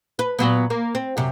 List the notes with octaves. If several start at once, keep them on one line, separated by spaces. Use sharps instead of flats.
B4
A#2 F#3 B3
A#3
C4
F#2 C3